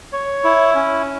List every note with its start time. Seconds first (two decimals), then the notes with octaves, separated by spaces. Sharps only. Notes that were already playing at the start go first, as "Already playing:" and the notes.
0.13 C#5
0.44 E4
0.75 C#4